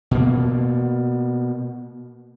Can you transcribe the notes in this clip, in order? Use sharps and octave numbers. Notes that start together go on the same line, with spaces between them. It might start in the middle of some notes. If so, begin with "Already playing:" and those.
B2 A#3